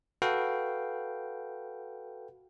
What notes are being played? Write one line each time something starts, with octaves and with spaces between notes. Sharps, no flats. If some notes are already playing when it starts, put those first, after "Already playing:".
F#4 A4 B4 F5 G5